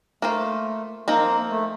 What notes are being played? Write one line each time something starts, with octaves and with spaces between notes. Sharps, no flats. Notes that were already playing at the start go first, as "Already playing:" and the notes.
A3 A#3 F4 C5
F3 A#3 C4 D#4
A3